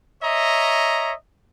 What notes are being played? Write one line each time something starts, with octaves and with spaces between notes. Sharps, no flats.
C#5 D#5 E5 A#5